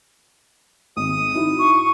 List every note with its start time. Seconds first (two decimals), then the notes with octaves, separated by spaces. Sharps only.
0.97 G#1 D#6
1.34 D#4 E4 F#4
1.59 C#6